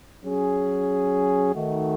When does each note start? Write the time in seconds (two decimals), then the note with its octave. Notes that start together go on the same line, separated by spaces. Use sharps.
0.24 F#3 C#4 G#4
1.54 D#3 A3 D#4 F#4